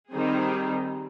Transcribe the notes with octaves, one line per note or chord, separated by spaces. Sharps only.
D#3 G3 C4 D#4 G#4